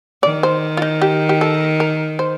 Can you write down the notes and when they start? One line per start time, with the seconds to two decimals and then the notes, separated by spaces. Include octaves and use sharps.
0.23 D#3 D5
0.43 C5
0.77 F4
0.82 D#4
1.02 G4
1.29 G4
1.41 A4
1.80 A#4
2.19 C5